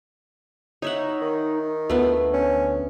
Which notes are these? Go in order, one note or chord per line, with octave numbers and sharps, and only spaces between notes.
D#4 C#5 E5 F#5
D#3
D2 A3 B3 F4
C#4